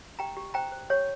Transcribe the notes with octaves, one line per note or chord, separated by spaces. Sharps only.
G4 G5 A#5
G4
C5 G5 A#5
C5
G4 C#5